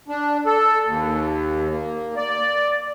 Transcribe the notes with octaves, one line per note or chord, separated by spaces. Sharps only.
D4
A4
D#2
A#3
D5